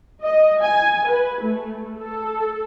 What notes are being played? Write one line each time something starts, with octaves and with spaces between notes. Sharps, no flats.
D#5
G#5
B4
A3
A4